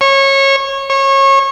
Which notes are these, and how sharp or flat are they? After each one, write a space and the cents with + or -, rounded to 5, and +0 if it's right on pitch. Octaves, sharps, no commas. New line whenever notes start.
C#5 -25
C#5 -30